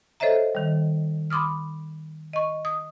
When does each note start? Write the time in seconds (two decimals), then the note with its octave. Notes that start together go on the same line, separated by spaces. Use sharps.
0.20 A4 C5 C#5 D#5 E5 A#5
0.55 D#3 G3
1.30 B5 C6 D6 D#6 F6
2.33 D#5 C#6
2.65 D#6